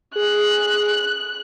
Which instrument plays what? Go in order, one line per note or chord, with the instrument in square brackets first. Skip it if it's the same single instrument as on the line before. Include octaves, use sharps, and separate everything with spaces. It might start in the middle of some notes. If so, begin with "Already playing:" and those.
[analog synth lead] G#4 [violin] F#6